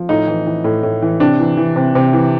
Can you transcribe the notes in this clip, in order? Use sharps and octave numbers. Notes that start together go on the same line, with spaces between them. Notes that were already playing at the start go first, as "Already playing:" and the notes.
Already playing: F3
A2 D#4
E3
E3
A2
A2
E3
C3 D4
E3
E3
C3
C3
E3